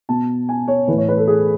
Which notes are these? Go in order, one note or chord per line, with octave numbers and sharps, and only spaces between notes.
B2 A5
G#5
C#5
E3 B4
A2
C#5
B4
A4
G#4